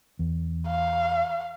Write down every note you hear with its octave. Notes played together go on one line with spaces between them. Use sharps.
E2
F5